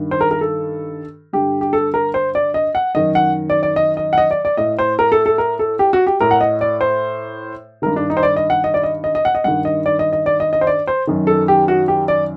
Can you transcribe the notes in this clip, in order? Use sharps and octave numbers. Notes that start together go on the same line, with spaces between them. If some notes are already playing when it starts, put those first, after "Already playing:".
Already playing: G2 D#3
C5
A#4
A#4
A4
G2 D3 G4
G4
A4
A#4
C5
D5
D#5
F#5
F#2 D#3 D#5
F#5
D5
D5
D#5
D#5
F#5
D#5
D5
D5
A2 D#5
C5
A#4
A4
A4
A#4
A4
G4
F#4
G4
A2 A#4
F#5
D#5
D5
C5
G2 D#3 A#4
D4
D#4
C5
D5
D#5
F#5
D#5
D5
D#5
D#5
D#5
F#5
D#5
G2 D#3 F#5
D#5
D5
D#5
D#5
D5
D#5
D#5
C5
D5
C5
F#2 D#3
A4
G4
F#4
G4
D5